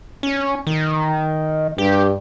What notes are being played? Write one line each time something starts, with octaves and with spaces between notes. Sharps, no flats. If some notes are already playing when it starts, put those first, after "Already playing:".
C#4
D#3
G2 G4